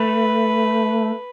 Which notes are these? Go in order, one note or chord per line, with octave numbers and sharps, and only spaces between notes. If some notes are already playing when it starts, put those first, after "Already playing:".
Already playing: A3 B4